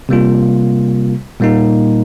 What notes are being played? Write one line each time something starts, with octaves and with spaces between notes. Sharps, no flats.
C3 G3 A#3 F4
A#2 G3 A#3 D#4